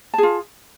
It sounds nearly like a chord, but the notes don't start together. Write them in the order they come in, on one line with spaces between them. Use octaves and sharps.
A5 G#4 F4